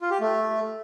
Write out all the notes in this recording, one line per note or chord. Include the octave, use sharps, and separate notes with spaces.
F4
G4
A3